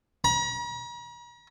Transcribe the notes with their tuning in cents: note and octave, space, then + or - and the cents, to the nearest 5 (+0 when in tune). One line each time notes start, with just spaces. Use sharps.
A#5 +45